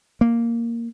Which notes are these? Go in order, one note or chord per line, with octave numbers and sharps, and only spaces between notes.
A#3